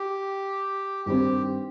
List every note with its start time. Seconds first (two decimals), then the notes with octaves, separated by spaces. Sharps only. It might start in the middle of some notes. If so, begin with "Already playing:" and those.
Already playing: G4
1.05 G2 D#3 G3 C4 G4